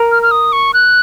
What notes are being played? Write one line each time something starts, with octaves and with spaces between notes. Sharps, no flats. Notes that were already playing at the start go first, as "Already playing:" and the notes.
Already playing: A#4
F6
F6
D#6
C#6
F#6